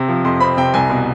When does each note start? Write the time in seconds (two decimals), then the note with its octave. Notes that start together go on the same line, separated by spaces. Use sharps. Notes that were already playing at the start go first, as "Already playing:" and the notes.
Already playing: C3 C4
0.09 F3
0.25 F2 C6
0.40 C4 B5
0.57 C3 G5
0.74 C2 G#5
0.90 B2